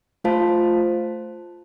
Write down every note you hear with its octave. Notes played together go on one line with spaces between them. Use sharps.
A3 F4 C5 F5 A5